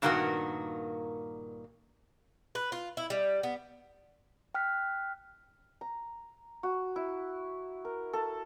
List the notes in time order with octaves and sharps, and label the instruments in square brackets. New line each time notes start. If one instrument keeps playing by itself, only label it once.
[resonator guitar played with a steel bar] G2 A#2 D#3 A#3 B3 F#4
[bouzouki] B4
F4
E4
G3
B3
[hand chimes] G5 F6 F#6 B6
[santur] A#5
F#4
E4
A#4
A4